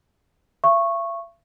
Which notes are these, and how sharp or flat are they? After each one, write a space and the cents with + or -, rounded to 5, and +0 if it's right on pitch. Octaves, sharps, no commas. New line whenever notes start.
E5 +45 C#6 -10